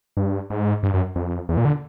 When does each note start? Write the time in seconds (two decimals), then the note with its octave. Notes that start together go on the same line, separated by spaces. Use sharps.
0.17 G2
0.50 G#2
0.83 G2
0.94 F#2
1.16 F2
1.49 E2
1.57 A#2
1.65 D3